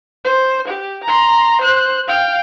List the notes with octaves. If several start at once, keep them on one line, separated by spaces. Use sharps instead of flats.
C5
G4
A#5 C6
C5 F#6
F5 G5